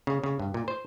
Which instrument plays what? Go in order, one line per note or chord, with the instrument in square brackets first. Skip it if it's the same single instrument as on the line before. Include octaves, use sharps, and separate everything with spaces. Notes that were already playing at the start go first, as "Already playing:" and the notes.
[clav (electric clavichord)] C#3
C#3
G2
A#2
C5